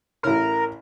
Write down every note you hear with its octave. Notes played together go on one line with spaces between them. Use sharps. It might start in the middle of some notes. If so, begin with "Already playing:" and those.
A1 E4 A#4 C#5